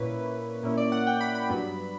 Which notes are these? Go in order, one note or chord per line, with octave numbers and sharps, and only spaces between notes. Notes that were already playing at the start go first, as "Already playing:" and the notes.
Already playing: A#2 A#3 C#4 E4 B4
A#2 A#3 C#4 E4
D5
F#5
G5
B5
B5
G2 F#3 B3 D4